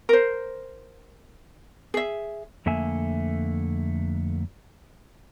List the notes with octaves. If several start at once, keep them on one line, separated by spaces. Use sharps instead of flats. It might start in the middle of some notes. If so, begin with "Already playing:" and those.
A#4 C5
G#4 E5
F2 D3 A3 A#3 E5 G#5